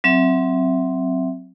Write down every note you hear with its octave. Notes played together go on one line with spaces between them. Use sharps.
F#3 C4 E5